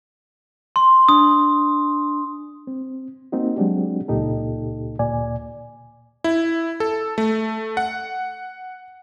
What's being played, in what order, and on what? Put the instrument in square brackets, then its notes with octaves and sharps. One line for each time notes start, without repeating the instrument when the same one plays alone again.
[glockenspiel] C6
[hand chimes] D4 [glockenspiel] D#6
[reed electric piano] C4
A#3 C4 D#4 F#4
F#3 G#3 C4 D4 F#4 G4
C#2 A#2 D#4 G4 A4
D2 A#2 D5 G#5
[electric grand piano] E4
A4
A3
F#5